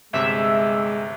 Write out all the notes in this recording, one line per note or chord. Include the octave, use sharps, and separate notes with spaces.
G1 C3 G#3 E5